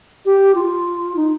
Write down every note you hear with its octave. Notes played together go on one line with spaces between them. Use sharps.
G4
F4
D#4